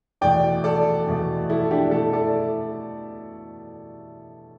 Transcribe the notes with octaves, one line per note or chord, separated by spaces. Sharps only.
E2 B2 A3 D5 G5
A4 D5
E2 B2 A3
E4 A4
D4 G4
B2 A3 E4 A4
A4 D5